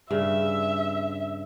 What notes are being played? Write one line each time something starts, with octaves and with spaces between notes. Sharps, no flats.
G2 C#3 E5